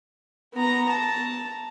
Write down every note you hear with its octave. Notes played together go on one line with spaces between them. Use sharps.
B3 A#5
A5 A#5